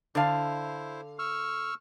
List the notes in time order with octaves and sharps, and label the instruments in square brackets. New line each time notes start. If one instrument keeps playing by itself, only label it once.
[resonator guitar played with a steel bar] D3 F5 [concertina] E4 C5 [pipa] D5 A5
[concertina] C#6 E6 F6